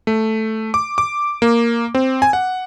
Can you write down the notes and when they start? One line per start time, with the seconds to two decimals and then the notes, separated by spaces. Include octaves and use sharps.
0.07 A3
0.74 D6
0.98 D6
1.42 A#3
1.95 C4
2.22 G#5
2.33 F#5